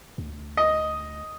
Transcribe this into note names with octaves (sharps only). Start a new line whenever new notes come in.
D2
D#5